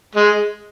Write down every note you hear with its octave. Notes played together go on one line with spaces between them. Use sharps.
G#3